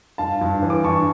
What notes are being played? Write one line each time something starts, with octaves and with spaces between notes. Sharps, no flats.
G2 F5 A5
G2
E3
D6
G2 A5 C#6